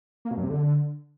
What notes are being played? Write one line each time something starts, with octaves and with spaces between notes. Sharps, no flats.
A#3
B2
F#2
C3
D3